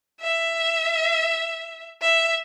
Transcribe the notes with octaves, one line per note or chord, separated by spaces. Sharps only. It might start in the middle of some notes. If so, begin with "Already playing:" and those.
E5
E5